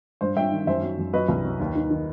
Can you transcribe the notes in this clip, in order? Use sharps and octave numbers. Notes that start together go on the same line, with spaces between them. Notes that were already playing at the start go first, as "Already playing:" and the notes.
G2 C5
G2 E5 G5
D#3
F#2 C5 E5
F#3
F#2
F#3 B4 D#5
C2
F#3
D#2
D#3
D#3